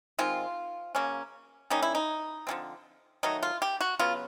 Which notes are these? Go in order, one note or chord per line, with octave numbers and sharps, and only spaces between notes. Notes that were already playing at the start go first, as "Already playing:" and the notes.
D#3 G#3 C4 F4
C#3 F#3 A#3 C#4
D#3 G3 A#3 C#4 D#4
E4
D#4
D3 F3 G#3 C4
D#3 F#3 A3 D#4
F4
G4
F#4
C#3 F#3 B3 F4